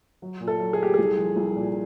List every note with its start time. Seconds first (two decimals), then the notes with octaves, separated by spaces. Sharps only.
0.22 F#3
0.40 A#2
0.47 A4
0.60 F#3
0.73 G#4
0.80 A3 G4
0.94 C2 G#4
1.18 F3
1.36 C2
1.56 A#2